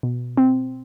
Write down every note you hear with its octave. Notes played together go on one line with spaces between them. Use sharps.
B2
C4